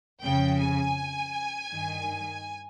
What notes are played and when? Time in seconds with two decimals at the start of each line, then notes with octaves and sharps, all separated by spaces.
0.22 F2 C#3 G5
0.59 G#5
1.71 G2 D#3